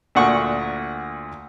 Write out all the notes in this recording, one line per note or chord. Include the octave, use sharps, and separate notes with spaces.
D2 A#2 F#5 C#6